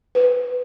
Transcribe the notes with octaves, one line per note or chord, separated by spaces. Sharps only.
B4